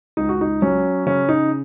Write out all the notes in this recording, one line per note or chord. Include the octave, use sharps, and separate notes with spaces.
C#2 D#4
F#4
D#4
F#3 C#4
C#3 C#4
D#4